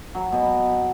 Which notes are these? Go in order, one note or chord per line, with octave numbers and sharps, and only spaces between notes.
F#3
B2